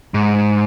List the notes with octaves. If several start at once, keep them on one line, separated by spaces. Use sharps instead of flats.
G#2